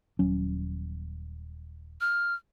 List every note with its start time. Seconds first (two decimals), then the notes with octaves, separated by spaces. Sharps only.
0.19 D#1 F#3 C#4
2.01 F6